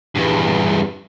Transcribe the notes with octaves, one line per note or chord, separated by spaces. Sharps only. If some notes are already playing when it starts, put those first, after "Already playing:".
E2 G2